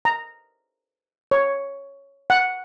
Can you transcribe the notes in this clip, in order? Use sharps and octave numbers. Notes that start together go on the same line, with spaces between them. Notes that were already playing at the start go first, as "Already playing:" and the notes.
A#5
C#5
F#5